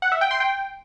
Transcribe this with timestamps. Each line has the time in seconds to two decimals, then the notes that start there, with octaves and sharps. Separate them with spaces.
0.02 F#5
0.12 E5
0.21 G5
0.31 C6
0.40 G5